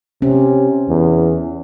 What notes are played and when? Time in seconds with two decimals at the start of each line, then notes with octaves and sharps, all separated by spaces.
0.22 C3 C#4
0.89 E2